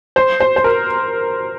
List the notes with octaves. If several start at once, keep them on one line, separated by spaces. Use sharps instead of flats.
C5
C5
C5
A#4